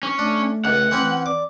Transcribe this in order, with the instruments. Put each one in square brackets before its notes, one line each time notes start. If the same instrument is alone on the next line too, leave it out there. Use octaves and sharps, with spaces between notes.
[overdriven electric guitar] C#4
[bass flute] A3 [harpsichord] D4
[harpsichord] C#2 [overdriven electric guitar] F#5
[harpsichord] E3 C4 C#4
[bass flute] D5 [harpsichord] D6